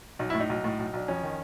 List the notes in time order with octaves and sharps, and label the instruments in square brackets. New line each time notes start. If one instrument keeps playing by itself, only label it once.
[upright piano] B1 D#4
A2 E4
D#4
B1
A2
B1
B1 D4
F2 C#4
D#3